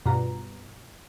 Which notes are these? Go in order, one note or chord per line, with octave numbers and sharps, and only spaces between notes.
G2 B2 F4 A#5